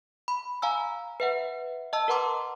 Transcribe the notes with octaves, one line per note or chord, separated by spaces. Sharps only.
B5
F5 G#5 A#5 E6
B4 E5 F#5
D#5 A5 E6
A#4 B4 F#5 A#5 C6 D6